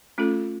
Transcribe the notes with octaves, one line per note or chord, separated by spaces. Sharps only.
A3 C#4 F4 A4